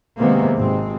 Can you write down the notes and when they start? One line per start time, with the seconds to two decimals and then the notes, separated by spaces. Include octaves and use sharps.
0.18 C3 D#3 G#3 A#3 B3
0.56 G#1 C3 G#3 C4